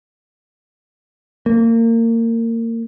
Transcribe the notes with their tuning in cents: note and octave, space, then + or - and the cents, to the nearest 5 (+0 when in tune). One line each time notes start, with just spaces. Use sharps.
A#3 -30